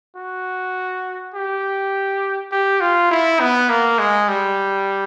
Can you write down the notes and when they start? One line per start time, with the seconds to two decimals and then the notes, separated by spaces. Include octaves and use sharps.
0.16 F#4
1.34 G4
2.52 G4
2.81 F4
3.11 E4
3.40 B3
3.69 A#3
3.99 G#3
4.28 G3